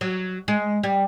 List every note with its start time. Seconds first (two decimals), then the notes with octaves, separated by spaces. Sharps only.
0.01 F#3
0.48 G#3
0.83 G3